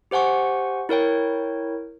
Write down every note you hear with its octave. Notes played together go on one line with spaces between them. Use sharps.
G4 C5 F#5 G#5 C#6
E4 A#4 C#5 G5